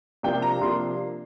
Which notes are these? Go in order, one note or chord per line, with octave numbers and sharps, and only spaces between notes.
C3 F3 A#3 D4 G5
A#5
C3 F3 A#3 D4 C6